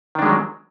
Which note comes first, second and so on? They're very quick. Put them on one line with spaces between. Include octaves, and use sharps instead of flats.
D#3 D4 G#3 F#3